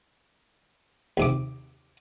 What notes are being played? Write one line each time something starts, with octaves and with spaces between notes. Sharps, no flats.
D#2 C3 D6